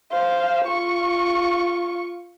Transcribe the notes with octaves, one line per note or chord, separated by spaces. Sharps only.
C5 F5
F4 C#6